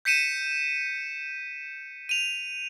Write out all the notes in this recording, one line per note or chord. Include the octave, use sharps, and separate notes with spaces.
G6 B6 C#7 D#7 E7
D#7 F7